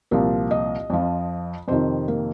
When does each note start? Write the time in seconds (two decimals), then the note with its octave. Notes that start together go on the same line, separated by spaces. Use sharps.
0.11 C2 A#2 F3 A#4
0.51 D#5
0.90 F2 F3
1.68 F2 C3 D#3 C5
2.08 A#3